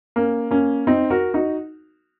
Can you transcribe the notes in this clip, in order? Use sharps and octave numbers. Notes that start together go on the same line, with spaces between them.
A#3 C#4
A#3 C#4
C4 D#4
F#4 A#4
D#4 F#4